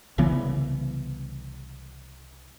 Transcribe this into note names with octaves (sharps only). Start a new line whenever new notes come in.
C2 C#3 E3 B3